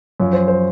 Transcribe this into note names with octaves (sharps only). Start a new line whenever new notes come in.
F#2 F3 C#5
C5
C5